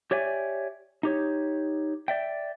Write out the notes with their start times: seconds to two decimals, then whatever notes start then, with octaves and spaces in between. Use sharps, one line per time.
0.11 G4 C#5 D5 E5 G#5
1.03 D#4 G4 C#5
2.08 D5 E5 G5